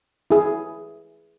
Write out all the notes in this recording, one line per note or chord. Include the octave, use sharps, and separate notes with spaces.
E4 G#4